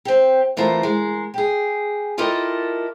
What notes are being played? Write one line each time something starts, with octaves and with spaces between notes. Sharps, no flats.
C4 G4
E3 A3 C4 F4 A#4
G#3 A#4
G4 G#4
E4 F4 G4 A4 A#4 D#5